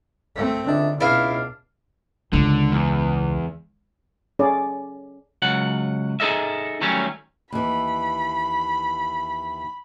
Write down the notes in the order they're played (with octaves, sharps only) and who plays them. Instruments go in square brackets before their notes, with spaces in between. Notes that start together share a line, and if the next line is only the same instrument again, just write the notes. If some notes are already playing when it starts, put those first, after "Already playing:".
[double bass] A3 C4
[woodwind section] C#2 D#4 E5 [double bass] D3 [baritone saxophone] D4
[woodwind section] C#2 [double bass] B2 [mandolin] D4 F5 [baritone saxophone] E4
[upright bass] C#2 [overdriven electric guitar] D3
[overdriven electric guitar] E2
[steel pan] C#4 G#4 A4 D5
[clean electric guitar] C#2 F#3 F#5
D#4 G#4 A4 D#5 E5
D#3 F#3 G3 A3 C#4
[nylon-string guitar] D#2 E3 [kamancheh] B5